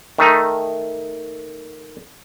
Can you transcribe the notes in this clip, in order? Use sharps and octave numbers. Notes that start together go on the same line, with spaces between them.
D#3 A3 D#4